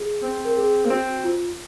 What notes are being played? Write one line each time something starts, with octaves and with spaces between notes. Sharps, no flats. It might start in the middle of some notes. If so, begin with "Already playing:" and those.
Already playing: G#4
C4
A#4
G#4
A#3
C4 F#4
F4